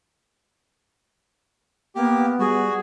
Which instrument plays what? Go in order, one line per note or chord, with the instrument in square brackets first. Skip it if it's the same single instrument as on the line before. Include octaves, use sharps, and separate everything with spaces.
[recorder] A#3 [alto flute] B3 [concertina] G4
[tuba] G3 [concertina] F#4 [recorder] G#4